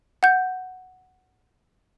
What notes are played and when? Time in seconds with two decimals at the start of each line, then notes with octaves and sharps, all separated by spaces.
0.23 F#5 G6